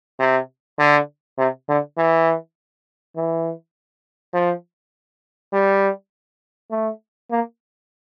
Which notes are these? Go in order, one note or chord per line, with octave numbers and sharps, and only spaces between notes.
C3
D3
C3
D3
E3
E3
F3
G3
A3
A#3